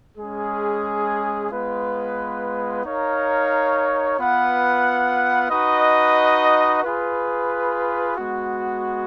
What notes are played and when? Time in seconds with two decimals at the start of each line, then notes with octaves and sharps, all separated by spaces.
0.16 G#3 C#4 G#4
1.50 G#3 B3 F4 B4
2.83 D#4 A#4 C#5 F5
4.17 B3 F4 B4 F#5
5.49 D#4 F#4 B4 D#5
6.83 F4 G#4 B4
8.15 G#3 B3 F#4